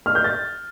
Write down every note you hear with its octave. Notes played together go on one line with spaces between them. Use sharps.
F6
G6
A6